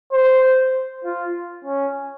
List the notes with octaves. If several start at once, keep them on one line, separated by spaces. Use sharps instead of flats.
C5
F4
C#4